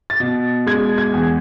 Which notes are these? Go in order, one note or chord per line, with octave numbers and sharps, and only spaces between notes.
A6
B2
G#3 G#6
G#6
E2